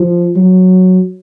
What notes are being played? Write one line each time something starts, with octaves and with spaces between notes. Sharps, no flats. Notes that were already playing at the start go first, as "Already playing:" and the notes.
Already playing: F3
F#3